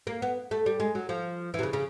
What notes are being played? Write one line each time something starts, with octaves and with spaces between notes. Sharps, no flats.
A#3
B3
A3
G3
G#3
F#3
F3
E3
C3
C#3
C#3